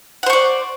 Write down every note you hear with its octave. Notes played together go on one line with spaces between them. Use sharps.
C5 D5 F#5 C#6